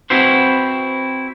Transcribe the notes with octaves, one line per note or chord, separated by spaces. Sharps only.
C4 E4 F#4 B4 C5